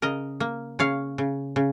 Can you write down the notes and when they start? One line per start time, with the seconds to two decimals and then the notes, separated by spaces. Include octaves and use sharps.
0.02 C#3 A#4 D#5
0.40 A#3
0.79 C#3 C#5 F5
1.18 C#3
1.56 C#3